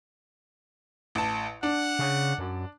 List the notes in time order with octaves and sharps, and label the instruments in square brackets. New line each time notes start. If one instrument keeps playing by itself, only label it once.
[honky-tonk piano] A1 A5
[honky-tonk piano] D4 [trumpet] F#5
[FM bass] C#3
F#2